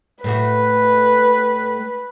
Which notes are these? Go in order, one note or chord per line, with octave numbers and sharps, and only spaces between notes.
A2 A3 F#4 B4